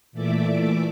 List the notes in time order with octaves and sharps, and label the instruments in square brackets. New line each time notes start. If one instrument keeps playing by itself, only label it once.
[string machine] A#2 E3 A3 D5 E5 D6